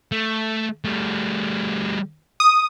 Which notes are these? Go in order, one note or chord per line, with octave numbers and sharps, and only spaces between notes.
A3
G3 A3
D#6